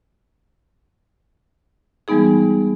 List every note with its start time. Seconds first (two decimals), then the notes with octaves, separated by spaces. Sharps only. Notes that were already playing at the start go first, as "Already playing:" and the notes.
2.08 E3 G3 G#3 B3 D#4 G#4